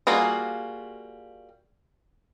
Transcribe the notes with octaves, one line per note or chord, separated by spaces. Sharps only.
G3 A#3 F4 F#4 G#4